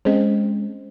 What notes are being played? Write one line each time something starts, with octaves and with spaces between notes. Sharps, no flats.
G#3 C4 C#4 C5 D#5